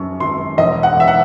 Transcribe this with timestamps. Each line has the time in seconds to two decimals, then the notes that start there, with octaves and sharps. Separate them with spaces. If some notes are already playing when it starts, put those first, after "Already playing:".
Already playing: F#2 C#6
0.20 G#1 C6
0.57 E1 D#5
0.83 F#5
0.96 E1 E5
1.08 F#5